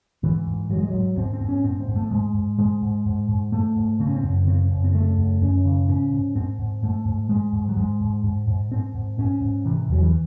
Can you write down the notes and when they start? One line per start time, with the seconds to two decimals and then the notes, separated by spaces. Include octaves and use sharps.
0.23 G#2 E3
0.47 G#2
0.70 G#2 F#3
0.78 G#3
0.88 F#3
0.94 G#2
1.17 G#2 C4
1.33 C4
1.41 G#2
1.49 C#4
1.64 G#2 C4
1.80 C4
1.88 G#2
1.96 A3
2.11 G#2 G#3
2.35 G#2
2.59 G#2 G#3
2.82 G#2
3.06 G#2
3.29 G#2
3.52 G#2 A3
3.76 G#2
4.00 C#3 C4
4.07 C#4
4.15 C4
4.24 F#2
4.47 C#3 C4
4.71 F#2
4.84 C4
4.94 C#3 A3
5.18 F#2
5.41 F#2 C#4
5.65 C#3
5.88 G#2 C#4
6.12 G#2
6.35 G#2 C4
6.59 G#2
6.83 G#2 A3
7.06 G#2
7.29 G#2 G#3
7.53 G#2
7.69 F#3
7.77 G#2 G#3
8.01 G#2
8.24 G#2
8.48 G#2
8.71 G#2 C4
8.95 G#2
9.18 G#2 C#4
9.42 G#2
9.65 C3 E3
9.89 E2 F#3
10.02 E3